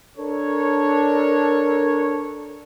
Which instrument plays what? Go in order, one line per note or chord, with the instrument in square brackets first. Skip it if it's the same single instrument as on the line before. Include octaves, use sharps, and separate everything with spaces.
[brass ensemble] D4 A4 A#4 C#5